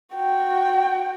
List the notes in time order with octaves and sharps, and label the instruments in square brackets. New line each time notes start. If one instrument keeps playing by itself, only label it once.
[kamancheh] F#4 G5